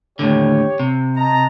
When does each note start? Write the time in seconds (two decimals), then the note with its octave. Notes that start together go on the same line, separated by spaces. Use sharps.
0.19 D#2 A2 D3 G4 C#5
0.80 C3
1.16 D#5 A5 A#5